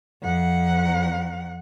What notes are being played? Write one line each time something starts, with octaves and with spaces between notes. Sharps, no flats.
F2 F#5